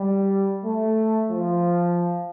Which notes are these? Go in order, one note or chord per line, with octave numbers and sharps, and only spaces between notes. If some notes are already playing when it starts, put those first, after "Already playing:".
Already playing: G3
A3
F3